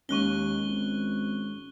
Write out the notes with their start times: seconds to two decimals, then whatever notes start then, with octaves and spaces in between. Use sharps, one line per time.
0.09 D#2 G#3 C#4 C#6 F#6 G7
0.67 G#1